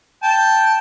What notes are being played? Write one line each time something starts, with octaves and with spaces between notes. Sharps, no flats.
G5 A5